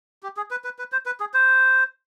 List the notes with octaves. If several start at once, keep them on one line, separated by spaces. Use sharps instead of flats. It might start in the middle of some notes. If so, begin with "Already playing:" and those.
G4
G#4
B4
B4
B4
C5
B4
G#4
C5